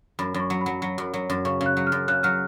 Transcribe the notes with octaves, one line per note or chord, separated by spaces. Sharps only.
F#2 B5
F#2
C#6
F#3
F#3 B5
F#3
F#2
F#3
F#2
C#3 C#6
C#3
F#6
F#3
F6
F#2
C#3 F#6
F#3 F6